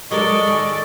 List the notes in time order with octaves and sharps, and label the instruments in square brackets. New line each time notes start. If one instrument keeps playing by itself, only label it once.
[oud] F#3 G#3 A#4 [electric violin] A4 D5 [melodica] D#5 C#6
[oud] D#3 G#4